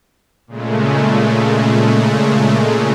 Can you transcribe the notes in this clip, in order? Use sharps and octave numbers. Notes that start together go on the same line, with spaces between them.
A#2 C#3 G#3 A3